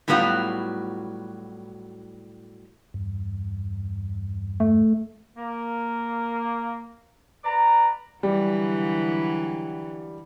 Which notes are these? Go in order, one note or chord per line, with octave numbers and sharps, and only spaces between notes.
A2 F#3 G3 B3 F4 F#4
E2 G2
A3
A#3
B4 D5 A#5
D3 E3 F#3 G3